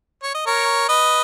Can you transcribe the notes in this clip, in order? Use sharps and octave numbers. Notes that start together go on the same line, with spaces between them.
C#5
D#5
A#4 C#5
B4 D#5